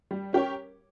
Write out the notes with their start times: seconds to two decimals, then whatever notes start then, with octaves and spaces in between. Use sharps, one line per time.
0.11 G3
0.33 C#4 G4 A#4 C#5